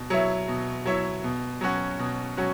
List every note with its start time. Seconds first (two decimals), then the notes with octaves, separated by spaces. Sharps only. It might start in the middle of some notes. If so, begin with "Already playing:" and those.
Already playing: B2
0.10 F#3 E4 C#5 E5
0.48 B2
0.85 F#3 E4 C#5 E5
1.24 B2
1.61 F#3 C#4 F#4
1.99 B2
2.37 F#3 C#4 F#4